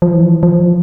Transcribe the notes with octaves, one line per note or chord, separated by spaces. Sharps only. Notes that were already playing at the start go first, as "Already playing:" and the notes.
F3
E3
F3